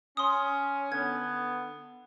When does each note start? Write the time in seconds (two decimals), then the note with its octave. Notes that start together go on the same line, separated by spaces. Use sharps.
0.17 C#4 C6 D#6
0.92 D3 B3 G#6